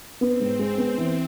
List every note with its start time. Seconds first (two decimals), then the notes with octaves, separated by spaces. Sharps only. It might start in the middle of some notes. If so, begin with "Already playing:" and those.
0.21 B3 C4
0.40 G#2
0.59 G#3
0.78 B3
0.98 E3